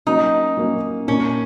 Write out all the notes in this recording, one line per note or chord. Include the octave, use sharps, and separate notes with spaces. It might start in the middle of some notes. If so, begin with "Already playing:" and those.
F#3 A#3 C#4 D#4
F#3 A#3 C#4
A#2 A#3 C#4 D#4